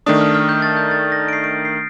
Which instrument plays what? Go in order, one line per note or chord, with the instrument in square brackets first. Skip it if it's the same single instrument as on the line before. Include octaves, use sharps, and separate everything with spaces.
[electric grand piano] D#3 A3 D4 [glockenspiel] D#6
[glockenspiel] F6
F6
G6
A6
G6
A6
A#6
D7
C7
D7
C7